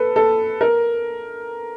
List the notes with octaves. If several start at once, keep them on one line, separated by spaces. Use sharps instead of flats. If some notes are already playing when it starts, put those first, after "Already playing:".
Already playing: A4 B4
A4
A#4